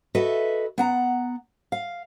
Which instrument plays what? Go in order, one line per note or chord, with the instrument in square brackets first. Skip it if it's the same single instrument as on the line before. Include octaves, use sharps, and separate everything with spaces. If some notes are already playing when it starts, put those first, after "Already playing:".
[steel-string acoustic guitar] F#4 A4 B4 D#5 E5
B3 F#5 A#5
F5